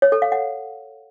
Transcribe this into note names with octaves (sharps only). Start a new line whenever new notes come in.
C#5
A4
F5
F#5